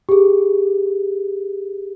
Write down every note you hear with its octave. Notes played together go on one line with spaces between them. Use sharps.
G4 G#4